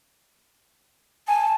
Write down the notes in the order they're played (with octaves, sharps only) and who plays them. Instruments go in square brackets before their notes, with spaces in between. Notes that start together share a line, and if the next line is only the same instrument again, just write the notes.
[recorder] G#5 [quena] A5